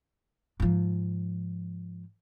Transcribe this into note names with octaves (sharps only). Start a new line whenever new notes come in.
G#2 F3